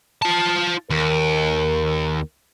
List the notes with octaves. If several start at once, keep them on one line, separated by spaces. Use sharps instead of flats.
F4 A5
D#2 A#4